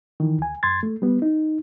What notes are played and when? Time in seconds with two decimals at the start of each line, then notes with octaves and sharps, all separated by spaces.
0.20 D#3 E3
0.38 D2 G#5
0.63 F#2 C6 G#6 A6
0.83 A3
1.02 G3 B3
1.22 D#4